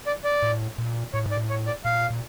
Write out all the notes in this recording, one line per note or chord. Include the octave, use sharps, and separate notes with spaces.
D5
D5
A2
A#2
A2 C#5
G#2
D5
A2
C#5
D5
A#2 F5
A#2